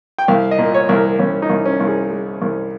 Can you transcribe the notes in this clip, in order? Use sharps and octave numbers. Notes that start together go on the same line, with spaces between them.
G5
C2 F5
D#5
A#2
C#5
C2
A#4
C2 C#4
D#4
C2
C#4
C2
G#4
G#3
C2